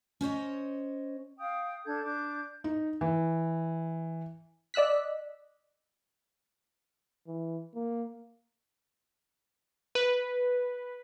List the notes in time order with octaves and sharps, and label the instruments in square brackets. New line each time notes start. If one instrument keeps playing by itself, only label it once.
[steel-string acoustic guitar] C#4 C5 C#5 D#5
[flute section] F5 G5 D#6
D4 A4 G6 G#6
D4 D6 G6
[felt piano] D#4
E3
[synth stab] D5 D#5 E6 F#6 B6
[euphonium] E3
A#3
[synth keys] B4